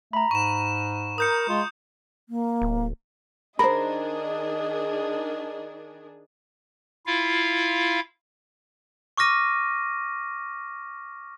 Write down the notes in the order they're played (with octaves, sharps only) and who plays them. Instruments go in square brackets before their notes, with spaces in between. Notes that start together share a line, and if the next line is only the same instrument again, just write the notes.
[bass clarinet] A3 [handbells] A#5 B5
[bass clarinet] G#2 [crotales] C#6 E7
[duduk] A#4 [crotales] D#6 G6 C#7
[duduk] G#3 [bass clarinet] F4
[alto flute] A#3
[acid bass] D1
[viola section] D#3 D4 G#4 [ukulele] A#4 C5 [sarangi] D#5 [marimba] B5
[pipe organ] E4 F4 F5
[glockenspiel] C#6 D6 F6 A#6 D#7